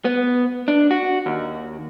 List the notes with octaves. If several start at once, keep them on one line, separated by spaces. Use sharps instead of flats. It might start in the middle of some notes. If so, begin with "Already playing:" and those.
B3
D4
F#4
D#2